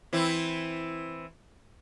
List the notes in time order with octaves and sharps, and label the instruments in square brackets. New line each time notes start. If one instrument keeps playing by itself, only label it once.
[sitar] E3 C4 E4